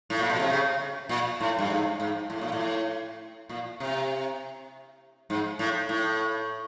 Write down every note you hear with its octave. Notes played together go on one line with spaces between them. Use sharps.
A2
A#2
B2
C3
C#3
A#2
A2
G2
G#2
G#2
A2
A#2
A2
A#2
C3
G#2
A2
A2